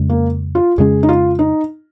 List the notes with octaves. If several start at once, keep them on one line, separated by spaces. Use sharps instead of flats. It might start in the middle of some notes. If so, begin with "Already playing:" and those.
Already playing: F2 C#3 G#3 C#4
A#3
F4
F2 C#3 G#3 C#4 G#4
D#4
F4
D#4